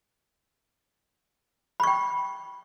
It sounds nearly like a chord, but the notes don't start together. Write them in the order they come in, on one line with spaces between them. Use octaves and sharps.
B5 C#6 G5